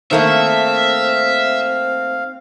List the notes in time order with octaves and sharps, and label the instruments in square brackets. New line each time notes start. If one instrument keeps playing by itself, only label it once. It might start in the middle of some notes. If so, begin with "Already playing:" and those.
[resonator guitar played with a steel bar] D#3 A3 A#3 [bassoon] C4 [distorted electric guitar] E5 [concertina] F5